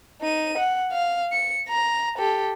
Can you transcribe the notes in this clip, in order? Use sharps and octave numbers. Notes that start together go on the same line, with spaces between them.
D#4 D#7
F#5
F5
C#7
A#5
G4 A4